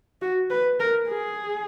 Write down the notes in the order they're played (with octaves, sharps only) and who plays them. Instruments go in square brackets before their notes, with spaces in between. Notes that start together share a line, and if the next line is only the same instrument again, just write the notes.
[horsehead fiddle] F#4
B4
A#4
G#4